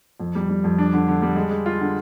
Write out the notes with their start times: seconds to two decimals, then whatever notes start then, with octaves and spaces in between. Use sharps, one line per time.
0.20 F2
0.35 G3
0.49 G3
0.64 F2
0.78 D4
0.93 D3
1.08 D3
1.22 G3
1.36 G#3
1.51 G#3
1.66 F4
1.81 D3